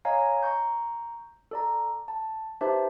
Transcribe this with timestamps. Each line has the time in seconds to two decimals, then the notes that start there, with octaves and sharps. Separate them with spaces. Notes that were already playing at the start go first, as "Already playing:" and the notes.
0.05 C#5 D#5 F5 G#5 A#5
0.43 A#5 C#6 G6
1.51 A4 D5 A#5
2.08 A5
2.61 D#4 G4 B4 C5 E5 A5